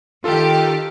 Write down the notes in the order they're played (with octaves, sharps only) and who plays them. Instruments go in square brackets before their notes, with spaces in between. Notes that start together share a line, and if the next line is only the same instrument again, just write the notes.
[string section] D#3 G4 [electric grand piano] F4 A4